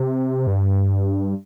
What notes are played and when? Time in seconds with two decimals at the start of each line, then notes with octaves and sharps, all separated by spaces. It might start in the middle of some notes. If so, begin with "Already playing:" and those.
Already playing: C3
0.47 G2